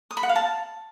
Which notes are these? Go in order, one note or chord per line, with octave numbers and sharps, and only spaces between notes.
D#6
B5
F#5
F5
A5